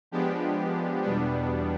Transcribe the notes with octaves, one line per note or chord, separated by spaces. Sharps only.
F3 G#3 B3 D4 G4
E2 B2 G3 B3 D4